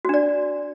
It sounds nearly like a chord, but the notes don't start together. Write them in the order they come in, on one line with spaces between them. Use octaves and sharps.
F#4 D4 D5